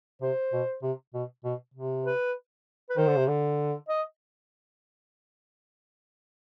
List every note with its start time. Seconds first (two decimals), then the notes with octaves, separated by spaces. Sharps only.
0.22 C3 C5
0.53 B2
0.83 C3
1.14 B2
1.44 B2
1.74 C3
2.06 B4
2.90 B4
2.97 D#3 C5
3.07 D3
3.18 C3
3.28 D3
3.89 D#5